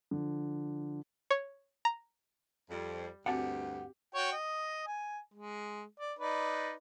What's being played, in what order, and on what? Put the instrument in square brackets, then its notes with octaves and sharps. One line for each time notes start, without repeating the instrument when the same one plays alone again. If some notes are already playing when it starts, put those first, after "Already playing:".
[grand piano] D3 F3
[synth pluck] C#5
A#5
[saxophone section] F2 [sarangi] G3
[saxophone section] D2 G2 [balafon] C4 F#4 A5 [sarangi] G4 [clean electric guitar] F#5
[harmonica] F#4 C#5 G5
D#5
G#5
G#3
D5
D#4 B4 D5